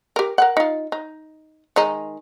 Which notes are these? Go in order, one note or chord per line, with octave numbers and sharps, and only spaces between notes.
G4 A#4
A#4 B4 F#5
D#4 F4
D#4
D#3 G#3 D#4